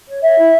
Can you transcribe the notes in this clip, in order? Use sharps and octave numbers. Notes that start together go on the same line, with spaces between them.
C#5
C#5 E5
E4